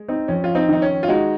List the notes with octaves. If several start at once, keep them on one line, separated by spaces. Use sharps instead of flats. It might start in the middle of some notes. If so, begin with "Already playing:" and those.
Already playing: G#3
C4 D#4
F2 C#4
F4
C4 D#4
D#3 D#4
C#4
F4
G#3 D#4 F#4